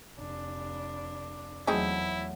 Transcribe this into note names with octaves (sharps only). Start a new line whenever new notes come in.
F1 D4
E2 E3 F#3 A3 C4 D#4 E4 G#4